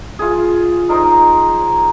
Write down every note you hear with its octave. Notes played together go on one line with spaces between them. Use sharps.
F4 G#4
D#4 A#4 C5 D#5